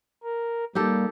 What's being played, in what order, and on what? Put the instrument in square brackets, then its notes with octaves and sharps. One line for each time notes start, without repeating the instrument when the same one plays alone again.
[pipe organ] A#4
[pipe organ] G3 A#3 [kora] D#4 G4 A4